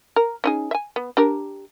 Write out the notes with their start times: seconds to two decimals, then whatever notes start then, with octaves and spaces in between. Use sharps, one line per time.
0.16 A#4
0.44 C#4 D#4 G#4
0.71 E5 G#5
0.96 B3
1.17 D4 G4 A#4